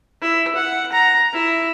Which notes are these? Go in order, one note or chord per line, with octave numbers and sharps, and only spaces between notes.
E4
F#5
A#5
E4